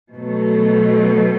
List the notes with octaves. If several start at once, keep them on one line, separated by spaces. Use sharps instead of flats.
B2 F#3 A3